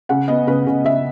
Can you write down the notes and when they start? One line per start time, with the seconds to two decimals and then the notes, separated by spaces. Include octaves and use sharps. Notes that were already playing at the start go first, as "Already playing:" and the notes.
0.09 C#3 F#5
0.28 B3 D#5
0.47 C#3 B4
0.66 C#3
0.84 C#3 E5